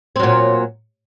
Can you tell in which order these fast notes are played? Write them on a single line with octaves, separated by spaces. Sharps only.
C4 F#3 A#2